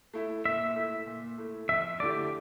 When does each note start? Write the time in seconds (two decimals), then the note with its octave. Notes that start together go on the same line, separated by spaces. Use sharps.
0.14 A3 E4
0.45 A#2 E5
0.76 A3 E4
1.07 A#2
1.38 A3 E4
1.69 F2 E5
2.00 D3 A3 E4 G4 D5